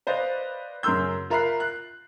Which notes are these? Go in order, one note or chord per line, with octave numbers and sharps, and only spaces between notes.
B4 C5 D5 D#5 F5
F#2 C#3 A#4 C6 E6 G6
F4 A#4 E5 B5 F#6 C7
F#6